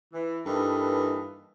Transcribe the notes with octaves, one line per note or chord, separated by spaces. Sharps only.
E3
G2 E3 A#3 D#4 A4 B4